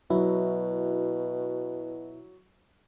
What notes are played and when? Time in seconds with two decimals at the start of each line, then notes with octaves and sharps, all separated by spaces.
0.10 B2 F#3 E4